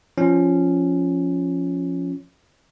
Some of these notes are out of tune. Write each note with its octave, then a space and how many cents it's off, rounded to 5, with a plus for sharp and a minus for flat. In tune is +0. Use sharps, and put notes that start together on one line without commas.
F3 -5 C#4 +0